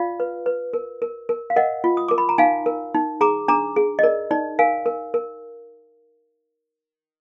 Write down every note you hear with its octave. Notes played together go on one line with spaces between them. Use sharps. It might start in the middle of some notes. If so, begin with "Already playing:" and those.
Already playing: F4 D5 F5
B4
B4
A#4
A#4
A#4
F5
A#4 D#5 F#5
F4
D#6
A#4 D6
B5
A#5
D#4 F5 G#5
A#4
D#4
G#4 A#5 D6
D4 A#5 D6
G#4
D#5
A#4 D5
D#4 D5
A#4 F5 G#5
A#4
A#4